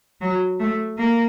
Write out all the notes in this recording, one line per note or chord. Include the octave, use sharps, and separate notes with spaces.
F#3
A3
A#3